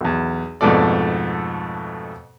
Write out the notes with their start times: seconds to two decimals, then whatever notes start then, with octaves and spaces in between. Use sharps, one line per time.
0.01 B1 E2
0.61 F2 G#2 B2 A3 A4 D5